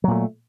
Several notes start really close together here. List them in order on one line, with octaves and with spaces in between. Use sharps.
F#3 A#2 A3